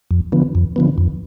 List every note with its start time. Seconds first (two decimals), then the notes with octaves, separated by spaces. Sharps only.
0.11 F2
0.32 D3 F3 B3
0.55 F2
0.76 D3 F3 B3
0.98 F2